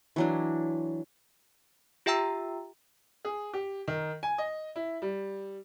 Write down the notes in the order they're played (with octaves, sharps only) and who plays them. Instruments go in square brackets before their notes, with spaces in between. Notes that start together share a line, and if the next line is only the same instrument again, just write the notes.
[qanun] E3 F#3 D4
[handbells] F4 G4 E5 G5 A#5 E6
[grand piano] G#4
G4
D#3
G#5
D#5
E4
G3